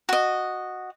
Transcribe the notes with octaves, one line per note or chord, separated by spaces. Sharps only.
F#4 D#5